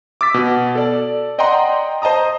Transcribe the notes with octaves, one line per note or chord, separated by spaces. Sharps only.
D6 E6 A6 B6
B2
A4 D5
D5 D#5 F#5 G5 A#5 C6
C5 D#5 A5 A#5 D#6